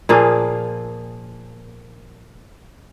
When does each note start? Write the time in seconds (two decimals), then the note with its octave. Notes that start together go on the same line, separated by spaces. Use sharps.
0.09 A#2 F3 A#3 G#4